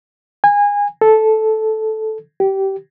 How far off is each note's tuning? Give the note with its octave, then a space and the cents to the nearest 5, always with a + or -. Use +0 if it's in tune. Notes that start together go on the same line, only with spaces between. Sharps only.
G#5 -25
A4 -10
G4 -20